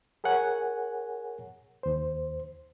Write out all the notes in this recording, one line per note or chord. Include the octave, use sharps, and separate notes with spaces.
G#4 A#4 C#5 F#5 G#5
D#2 C5